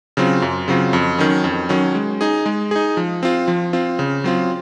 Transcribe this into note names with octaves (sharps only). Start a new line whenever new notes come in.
C#3 F#3 C4 F4
F#2
C#3 F#3 C4 F4
F2
D#3 F#3 C#4
F2
D#3 F#3 C#4
G#3
D#4 G#4
G#3
D#4 G#4
F3
C4 F4
F3
C4 F4
C#3
F#3 C4 F4